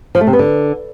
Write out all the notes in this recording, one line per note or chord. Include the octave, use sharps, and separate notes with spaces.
F3
A3
C3
B3
D3